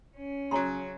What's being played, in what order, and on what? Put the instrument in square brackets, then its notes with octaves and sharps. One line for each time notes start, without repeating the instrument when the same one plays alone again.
[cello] C#4
[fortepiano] C#3 F#3 [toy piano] C#5 A#5 C6